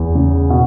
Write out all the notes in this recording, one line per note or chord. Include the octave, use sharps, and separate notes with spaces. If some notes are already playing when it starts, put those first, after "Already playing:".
Already playing: E2
C#3
B2